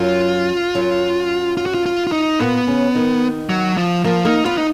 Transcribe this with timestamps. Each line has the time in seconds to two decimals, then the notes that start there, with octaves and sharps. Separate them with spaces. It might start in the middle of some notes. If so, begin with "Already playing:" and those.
Already playing: F#2 F#3 F4
0.75 F#2 F#3
1.57 F4
1.66 F#4
1.74 F4
1.86 F4
2.07 F4
2.12 D#4
2.39 A#2 A#3 B3
2.67 C#3 C#4
2.95 D#3 D#4
3.50 F#3
3.77 F3
4.04 F3 A#3 A#4
4.25 A#3 D#4 A#4
4.45 B3 F4 B4
4.58 D#4